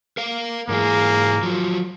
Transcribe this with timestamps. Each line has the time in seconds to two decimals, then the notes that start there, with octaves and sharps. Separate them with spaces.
0.17 A#4 F5
0.69 G#2 E3 A#3 G#4
1.43 F3 F#3